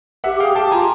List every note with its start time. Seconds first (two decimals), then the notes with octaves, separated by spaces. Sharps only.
0.24 G4 E5 F#5
0.40 G#4 F5 G5
0.55 G4 G5 A5
0.71 F4 G#5 A#5